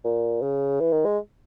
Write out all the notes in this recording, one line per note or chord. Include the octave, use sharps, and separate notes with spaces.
A#2
C#3
E3
D#3
G#3